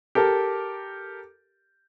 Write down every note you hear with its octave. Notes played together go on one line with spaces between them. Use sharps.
G4 A4 A#4